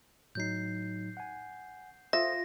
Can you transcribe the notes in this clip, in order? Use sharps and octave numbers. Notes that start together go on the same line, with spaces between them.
A2 F#3 D#4 G6 C7
F#5 G#5
F4 A4 C5 E5 D#6 A#6